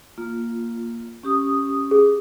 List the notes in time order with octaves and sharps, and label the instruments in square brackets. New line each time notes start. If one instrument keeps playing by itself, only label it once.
[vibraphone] A#3 F4
C#4 G4 D#6
[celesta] G#4